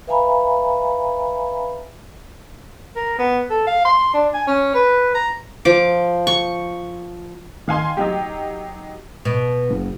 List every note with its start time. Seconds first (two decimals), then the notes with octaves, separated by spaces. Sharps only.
0.07 B4 E5 F5 G#5 A#5 B5
2.96 A#4
3.19 B3
3.50 A4
3.67 F5
3.85 C6
4.14 D4
4.34 G#5
4.47 C#4
4.74 B4
5.15 A#5
5.65 F3 D6
6.27 C#6
7.68 D#3 F5 G#5 C6
7.97 F#3 D#4 G4
9.25 B2
9.69 F#1